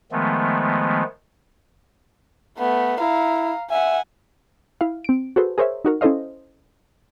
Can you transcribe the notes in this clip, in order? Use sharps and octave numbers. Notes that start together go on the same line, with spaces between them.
D#3 F3 G#3 A3 B3
A3 B3
E4 F5 A#5
E5 F#5 G#5
E4 F5
C4 D7
F#4 G#4 A4 B4 C5
G#4 A#4 C5 C#5 E5
D#4 F#4 A#4
C#4 E4 A4 C5 D#5 F5